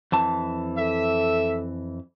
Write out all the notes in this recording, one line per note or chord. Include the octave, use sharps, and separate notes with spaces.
F2 E3 A5
A4 E5